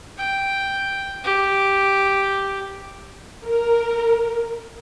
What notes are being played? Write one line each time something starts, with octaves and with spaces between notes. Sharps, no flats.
G5
G4
A#4